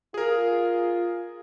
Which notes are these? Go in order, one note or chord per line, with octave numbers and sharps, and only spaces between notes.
F4 G#4 A#4